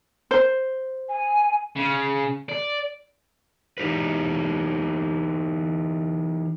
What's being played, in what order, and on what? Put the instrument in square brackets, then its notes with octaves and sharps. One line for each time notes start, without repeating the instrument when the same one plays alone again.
[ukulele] C5
[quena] G#5
[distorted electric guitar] C#3
D5
[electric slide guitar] E3 D#4 G4 B4